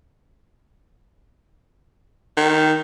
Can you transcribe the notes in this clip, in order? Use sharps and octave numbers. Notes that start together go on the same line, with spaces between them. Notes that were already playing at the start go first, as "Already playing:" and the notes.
D#3